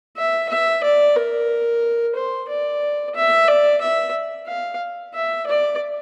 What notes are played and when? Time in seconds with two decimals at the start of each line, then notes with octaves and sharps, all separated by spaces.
0.17 E5
0.49 E5
0.84 D5
1.16 A#4
2.15 C5
2.49 D5
3.15 E5
3.48 D5
3.81 E5
4.47 F5
5.14 E5
5.47 D5